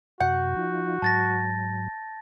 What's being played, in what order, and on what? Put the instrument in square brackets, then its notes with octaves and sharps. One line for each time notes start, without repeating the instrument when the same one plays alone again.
[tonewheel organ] F#2 C3 [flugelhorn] F#4 [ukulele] F#5 [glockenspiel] G6
[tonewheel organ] F3 D#4 F4
[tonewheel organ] G#2 F#3 [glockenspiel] A5 A6 A#6